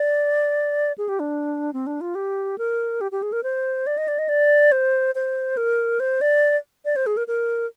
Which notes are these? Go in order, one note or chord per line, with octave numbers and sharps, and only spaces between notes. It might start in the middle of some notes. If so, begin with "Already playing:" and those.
Already playing: D5
G#4
G4
D4
C4
D4
F4
G4
A#4
G4
G4
G#4
A#4
C5
D5
D#5
D5
D#5
D5
C5
C5
A#4
C5
D5
D5
C5
G#4
A#4
A#4